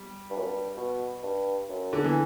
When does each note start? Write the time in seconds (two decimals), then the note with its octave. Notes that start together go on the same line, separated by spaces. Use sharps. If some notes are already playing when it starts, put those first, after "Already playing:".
Already playing: G3
0.30 G2
0.37 F#2
0.45 G2
0.77 B2
1.23 G2
1.69 F#2
1.93 D3
2.04 E3